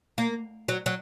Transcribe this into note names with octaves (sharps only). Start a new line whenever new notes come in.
A#3
F#3
F#3